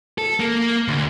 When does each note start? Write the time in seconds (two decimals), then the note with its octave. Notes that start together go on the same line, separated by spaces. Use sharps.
0.18 A4
0.40 A#3
0.88 D2